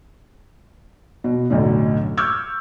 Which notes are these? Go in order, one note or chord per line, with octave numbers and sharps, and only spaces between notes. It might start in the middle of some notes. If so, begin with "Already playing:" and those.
B2
B1 F#2 A2 D3
C#6 D6 E6 F6 G6 G#6